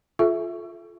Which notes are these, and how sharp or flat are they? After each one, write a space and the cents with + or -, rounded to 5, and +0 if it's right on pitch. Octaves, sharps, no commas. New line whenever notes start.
F4 +0 A4 -35 E5 +0